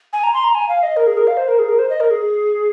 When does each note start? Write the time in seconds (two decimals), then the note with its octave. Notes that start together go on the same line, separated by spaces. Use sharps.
0.13 G#5
0.24 A#5
0.34 C6
0.44 A#5
0.55 G#5
0.69 F5
0.83 D#5
0.96 A#4
1.07 G#4
1.17 A#4
1.27 F5
1.37 C5
1.48 A#4
1.59 G#4
1.68 A#4
1.79 C5
1.90 D#5
2.00 A#4
2.11 G#4